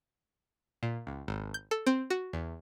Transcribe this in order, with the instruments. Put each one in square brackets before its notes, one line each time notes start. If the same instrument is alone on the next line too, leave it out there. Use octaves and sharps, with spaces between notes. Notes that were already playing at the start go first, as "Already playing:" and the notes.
[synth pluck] A#2
C#2
G#1
G6
A4
C4
F#4
E2